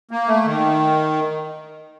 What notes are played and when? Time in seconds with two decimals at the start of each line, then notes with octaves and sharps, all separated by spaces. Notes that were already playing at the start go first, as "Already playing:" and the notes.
0.11 A#3
0.28 A3
0.46 D#3